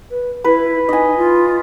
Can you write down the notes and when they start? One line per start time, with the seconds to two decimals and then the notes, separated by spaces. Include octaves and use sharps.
0.11 B4
0.44 E4 B4
0.89 D#4 D#5 G#5
1.17 F4